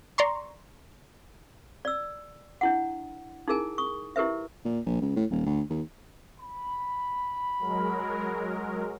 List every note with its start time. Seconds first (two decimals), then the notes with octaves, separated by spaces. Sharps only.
0.18 D5 A#5 C6 C#6
1.85 D5 E6
2.61 D4 E4 F#5
3.48 D#4 E4 G#4 A#4 G#5
3.78 C#6 D#6
4.16 E4 G4 A#4 B4 E5
4.65 A#2
4.86 A#1
5.02 C#2
5.16 A2
5.30 D#1
5.46 D2
5.70 D#2
6.39 B5
7.59 F#3 G#3 A#4